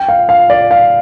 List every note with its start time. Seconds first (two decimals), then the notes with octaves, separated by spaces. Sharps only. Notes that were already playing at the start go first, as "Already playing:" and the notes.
Already playing: G5
0.09 F5
0.29 F5
0.50 D5
0.71 F5